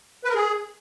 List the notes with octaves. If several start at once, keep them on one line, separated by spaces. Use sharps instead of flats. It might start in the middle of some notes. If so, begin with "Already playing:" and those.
B4
A#4
G#4